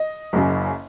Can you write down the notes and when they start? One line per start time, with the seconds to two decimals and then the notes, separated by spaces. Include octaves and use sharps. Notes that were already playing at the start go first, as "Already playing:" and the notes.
Already playing: D#5
0.33 F#1 F#2 C#3